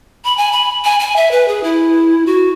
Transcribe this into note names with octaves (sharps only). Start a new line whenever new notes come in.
B5
G#5
B5
G#5
G#5
E5
B4
G#4
E4
F#4